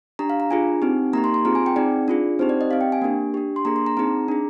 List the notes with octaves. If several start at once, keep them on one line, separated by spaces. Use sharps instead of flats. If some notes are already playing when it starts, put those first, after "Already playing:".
D4 G4 A#5
F5
A#5
D4 F4 G#4 G#5
C4 D#4 G4
A#3 D#4 G4 A#5
C6
C6
C4 F4 G#4 A#5
G#5
G5
C4 D#4 G#4 D5
D4 F4 G#4
C4 D#4 G4 C5
D5
D#5
C4 G4 F5
G5
G#5
A#3 D4 G4
D4 G4
C6
A#3 D4 G#4 A#5
C6
A#5
C4 D#4 G#4 A#5
D4 G#4